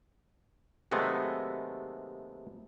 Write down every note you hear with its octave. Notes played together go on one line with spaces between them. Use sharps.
D#2 C3 F#3 G#3 A3 B3